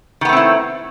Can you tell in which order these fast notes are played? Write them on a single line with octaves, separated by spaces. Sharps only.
D#3 B3 A3 C4 E4